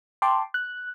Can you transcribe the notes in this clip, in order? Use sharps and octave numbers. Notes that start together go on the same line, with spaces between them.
G5 A5 C6 D6
F#6